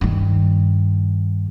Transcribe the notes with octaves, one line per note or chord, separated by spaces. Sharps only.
G2 D#3